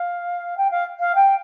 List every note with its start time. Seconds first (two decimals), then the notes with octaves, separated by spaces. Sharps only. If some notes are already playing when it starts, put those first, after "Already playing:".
Already playing: F5
0.57 G5
0.71 F5
0.99 F5
1.15 G5